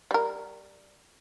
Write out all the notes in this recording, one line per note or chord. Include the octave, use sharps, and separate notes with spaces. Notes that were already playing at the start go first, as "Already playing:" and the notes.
G3 A#4